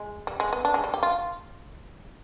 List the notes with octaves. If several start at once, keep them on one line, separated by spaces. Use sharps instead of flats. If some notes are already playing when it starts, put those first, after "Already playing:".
Already playing: G#3
G3
G#3
B3
D4
G#3
G3
G4
F4